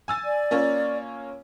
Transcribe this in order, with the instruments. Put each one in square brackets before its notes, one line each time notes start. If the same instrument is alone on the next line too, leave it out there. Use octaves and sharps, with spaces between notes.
[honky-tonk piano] G#5 E6 A6
[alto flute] D5
[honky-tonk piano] A#3 C#4 F4